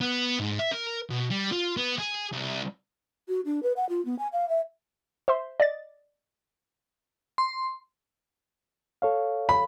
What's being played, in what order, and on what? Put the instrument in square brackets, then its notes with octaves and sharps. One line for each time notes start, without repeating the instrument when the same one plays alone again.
[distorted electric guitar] B3
G#2
E5
A#4
B2
G3
F4
B3
G#4
C2
[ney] F#4
D4
B4
F#5
F4
B3
G#5
F5
E5
[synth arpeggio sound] C5 E5 C6
D5 D#5 A6
[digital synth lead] C6
[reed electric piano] A4 C#5 F5
[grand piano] B5